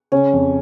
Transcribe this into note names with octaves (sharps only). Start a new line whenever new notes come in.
C#3 C#4
F2